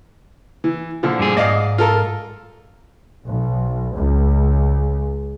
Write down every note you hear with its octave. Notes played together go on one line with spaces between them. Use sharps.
E3
A#2 D3 F3
G2 G#4
G#2 D5 D#5 F5
F4 A4 A#4
B1
C#2